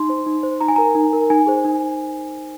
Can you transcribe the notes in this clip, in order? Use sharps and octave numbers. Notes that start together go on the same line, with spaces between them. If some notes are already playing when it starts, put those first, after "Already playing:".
Already playing: D#4 C6
C5
D#4
C5
D#4 A#5
G#5
A#4 A#5
D#4
A#4
D#4 G#5
G#4 C5
D#4